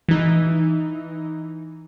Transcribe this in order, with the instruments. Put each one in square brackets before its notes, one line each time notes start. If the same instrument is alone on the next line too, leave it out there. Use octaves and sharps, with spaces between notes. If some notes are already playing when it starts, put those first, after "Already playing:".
[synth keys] E3 D#4